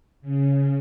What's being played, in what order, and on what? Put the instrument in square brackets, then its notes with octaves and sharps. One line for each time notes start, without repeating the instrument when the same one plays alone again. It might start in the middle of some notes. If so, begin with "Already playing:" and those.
[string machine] C#3